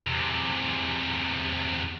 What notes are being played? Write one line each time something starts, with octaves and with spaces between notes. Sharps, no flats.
E2 C3